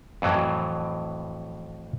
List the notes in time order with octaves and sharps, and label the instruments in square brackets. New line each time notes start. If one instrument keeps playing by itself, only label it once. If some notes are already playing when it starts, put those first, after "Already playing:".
[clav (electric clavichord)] F2 A2 E3 F#3